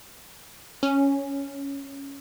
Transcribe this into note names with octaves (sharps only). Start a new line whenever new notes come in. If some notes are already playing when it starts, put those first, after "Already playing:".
C#4